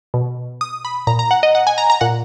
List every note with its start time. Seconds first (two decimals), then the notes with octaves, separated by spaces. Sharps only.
0.14 B2
0.61 D#6
0.85 B5
1.07 A#2 A#5
1.19 A#5
1.31 F#5
1.43 D#5
1.55 F#5
1.67 G#5
1.78 A#5
1.90 A#5
2.01 A#2 F#5